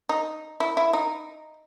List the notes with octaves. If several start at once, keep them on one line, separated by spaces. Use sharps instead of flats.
D#4
E4
E4
D#4